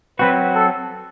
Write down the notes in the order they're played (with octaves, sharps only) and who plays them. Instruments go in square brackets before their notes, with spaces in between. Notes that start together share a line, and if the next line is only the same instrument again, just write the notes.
[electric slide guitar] F#3 C4 F#4 [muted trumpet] B4
[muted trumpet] A4